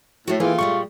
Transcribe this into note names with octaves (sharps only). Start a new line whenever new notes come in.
A2 A3 F#4
E3 A3 A#3 F4 G#4 G5
A#2 G3 G#3 C#6